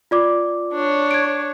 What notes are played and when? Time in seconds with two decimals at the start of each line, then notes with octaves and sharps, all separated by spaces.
0.11 F4 D5 D6
0.73 D4 C#5
1.11 G#6 D7